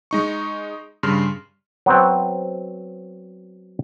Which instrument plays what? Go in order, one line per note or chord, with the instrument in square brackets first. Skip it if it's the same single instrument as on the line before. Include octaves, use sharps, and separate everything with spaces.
[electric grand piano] G#3 D#4 C#6
G2 C#3 C6 F6
[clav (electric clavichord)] F#3 B3 C4 C5